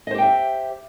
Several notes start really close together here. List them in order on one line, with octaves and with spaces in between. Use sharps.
D#5 C5 G4 G5 E5